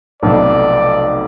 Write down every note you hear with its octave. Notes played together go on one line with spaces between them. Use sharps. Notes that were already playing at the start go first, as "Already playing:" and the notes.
F1 B1 F2 D5